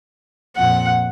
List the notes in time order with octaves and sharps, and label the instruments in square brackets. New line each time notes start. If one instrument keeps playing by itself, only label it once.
[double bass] F2 A#2 [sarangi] F#5